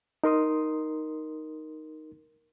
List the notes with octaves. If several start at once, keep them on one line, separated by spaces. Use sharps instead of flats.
D#4 A#4 C6 D#6